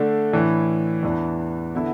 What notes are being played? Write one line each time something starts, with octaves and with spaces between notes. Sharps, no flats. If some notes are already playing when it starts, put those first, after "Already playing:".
Already playing: D3 A3 D4
A2 E3 D4
E2 E3 D4
D3 B3 E4